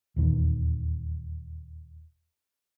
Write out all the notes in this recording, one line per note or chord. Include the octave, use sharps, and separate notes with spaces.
D#1 E2 D#3